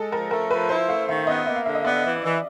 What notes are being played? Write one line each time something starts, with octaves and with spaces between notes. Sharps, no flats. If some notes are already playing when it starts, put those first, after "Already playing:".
Already playing: G#3 A4
F3 A#4
A3 A#4
F3 B4
E4 C5
A3 F5
D#3 E5
B3 D#5
A#3 E5
F5
D3 E5
D#5
B3 D5
E3
E3